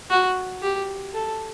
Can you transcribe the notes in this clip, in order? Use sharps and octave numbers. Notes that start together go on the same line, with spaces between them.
F#4
G4
A4